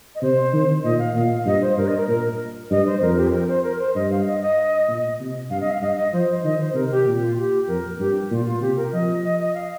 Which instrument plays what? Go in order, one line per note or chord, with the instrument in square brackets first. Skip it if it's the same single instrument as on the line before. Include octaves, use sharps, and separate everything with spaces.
[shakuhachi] D#5
[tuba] C3 [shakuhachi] C5
[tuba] D#3
[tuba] A#2 [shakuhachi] D#5
[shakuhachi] F5
[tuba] A#2 [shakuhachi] F5
[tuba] G2 [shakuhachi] D#5
[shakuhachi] C5
[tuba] G2 [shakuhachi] A#4
[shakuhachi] D#5
A#4
[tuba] A#2 [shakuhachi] A#4
[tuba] G2 [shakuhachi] D#5
[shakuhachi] C5
[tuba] F2 [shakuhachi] A#4
[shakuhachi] G4
C5
A#4
C5
A#4
C5
[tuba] G2 [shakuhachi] D#5
[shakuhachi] F5
D#5
D#5
[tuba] A#2
C3
[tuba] G2 [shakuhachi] F5
[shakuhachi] D#5
F5
[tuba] G2 [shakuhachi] D#5
[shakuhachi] D#5
[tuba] F3 [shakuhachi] C5
[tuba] D#3 [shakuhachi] D#5
[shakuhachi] C5
[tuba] C3 [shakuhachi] A#4
[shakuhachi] G4
[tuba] A#2
[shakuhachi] F4
G4
[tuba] F2 [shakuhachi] A#4
[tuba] G2 [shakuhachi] G4
[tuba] A#2 [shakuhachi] F4
[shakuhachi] F4
[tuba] C3 [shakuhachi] G4
[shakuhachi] A#4
[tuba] F3 [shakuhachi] D#5
[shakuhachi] D#5
D#5
F5